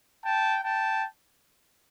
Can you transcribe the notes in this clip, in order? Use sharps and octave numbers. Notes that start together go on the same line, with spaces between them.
G5 A5
G5 A5